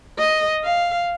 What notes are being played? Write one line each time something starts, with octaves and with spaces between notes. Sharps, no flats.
D#5
F5